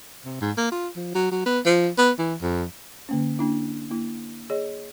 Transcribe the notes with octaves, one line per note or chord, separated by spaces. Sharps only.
C3
G#2
A#3
F4
F3
F#3
F#3
B3
F3
B3
E3
F2
D3 A#3 C#4
A#3 D4 E4
A#3 E4
G#4 C#5 D#5